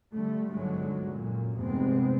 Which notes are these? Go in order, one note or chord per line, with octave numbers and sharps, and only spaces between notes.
D3 G3 A3
G1 C#2 G#2 D3 F#3 G#3
F#2 A#2
F1 G#2 C3 G#3 B3 C4